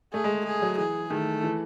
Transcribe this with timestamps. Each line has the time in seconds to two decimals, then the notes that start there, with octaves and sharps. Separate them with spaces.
0.13 A3 G#4
0.24 G#3
0.46 G#4
0.62 F#3
0.78 E3 G#4
1.10 D#3 A3
1.44 E3